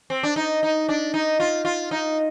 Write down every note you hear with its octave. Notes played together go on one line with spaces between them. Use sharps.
C4
D4
D#4
D#4
D4
D#4
F4
F4
D#4